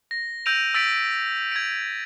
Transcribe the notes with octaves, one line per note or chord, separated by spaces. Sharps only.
A#6
E6 G6 A#6 D7 D#7 F7
E6 A6 B6 D7
G#6 D7